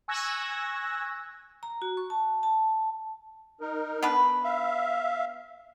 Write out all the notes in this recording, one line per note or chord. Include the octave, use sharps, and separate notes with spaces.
G#5 C#6 E6 F#6 G#6 A#6
A#5
F#4
C#6
A5
A5
D#4 A#4
B3 D4 B4
E5 F5